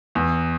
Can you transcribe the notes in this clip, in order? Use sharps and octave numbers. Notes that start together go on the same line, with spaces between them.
E2